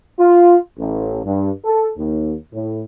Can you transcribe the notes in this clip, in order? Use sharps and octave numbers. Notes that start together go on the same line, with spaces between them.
F4
A1
G2
A4
D#2
A2